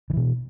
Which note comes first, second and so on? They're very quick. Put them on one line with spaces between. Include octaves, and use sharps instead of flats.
D#3 E3 B2